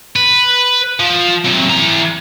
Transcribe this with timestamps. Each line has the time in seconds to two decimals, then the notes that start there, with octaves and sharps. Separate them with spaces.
0.16 B4
1.00 F3
1.45 C3 F#3
1.69 E3 A#5